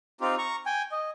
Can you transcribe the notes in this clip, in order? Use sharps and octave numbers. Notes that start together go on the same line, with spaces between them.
C4 D#4 F4 G4
A#5 C#6
G5 G#5
D#5